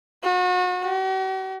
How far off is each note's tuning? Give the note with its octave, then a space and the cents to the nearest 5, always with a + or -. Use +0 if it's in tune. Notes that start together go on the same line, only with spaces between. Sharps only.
F#4 -35
F#4 +45